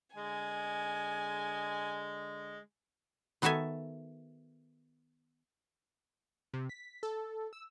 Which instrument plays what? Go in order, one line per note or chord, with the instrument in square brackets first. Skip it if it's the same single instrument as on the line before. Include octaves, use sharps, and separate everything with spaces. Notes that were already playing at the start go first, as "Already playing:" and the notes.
[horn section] D3 G#3 [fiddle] G#5
[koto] D#3 B3 F#4 A4 E5 G#5
[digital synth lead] C3
B6
A4
E6